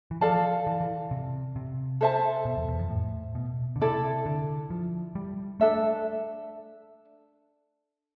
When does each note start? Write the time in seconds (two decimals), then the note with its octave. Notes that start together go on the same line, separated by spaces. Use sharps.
0.11 E3
0.21 F3 A4 D5 F5 A5
0.67 E3
0.81 E3
1.11 C3
1.56 C3
2.01 A4 C5 E5 A5
2.45 B2
2.57 E2
2.68 E2
2.79 F2
2.90 A2
3.35 B2
3.76 D3
3.80 C3 E4 A4 D5
4.26 D3
4.70 F3
5.15 G3
5.60 A3 D4 A4 E5